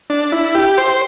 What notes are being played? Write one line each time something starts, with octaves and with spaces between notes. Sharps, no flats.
D4
E4
G4
C5